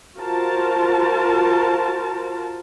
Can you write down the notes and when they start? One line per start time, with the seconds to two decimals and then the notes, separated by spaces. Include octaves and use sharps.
0.17 F4 F#4 A#4 C5 A5